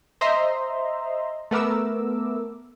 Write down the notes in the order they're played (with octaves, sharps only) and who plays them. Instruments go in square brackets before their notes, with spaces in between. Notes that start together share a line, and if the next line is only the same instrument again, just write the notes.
[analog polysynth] C5 D#5 E5 A#5 C6
A3 B3 A#4 D6 E6